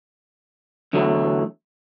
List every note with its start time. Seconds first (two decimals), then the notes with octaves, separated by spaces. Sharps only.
0.93 E2 D3 F#3 A3